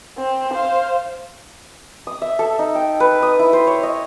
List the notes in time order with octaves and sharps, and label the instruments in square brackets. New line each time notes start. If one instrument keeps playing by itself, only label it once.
[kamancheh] C4
C5 F5
[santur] D#6
E5
A4
D#4
G5
B4
D#6
E4
C5
C#5
D#5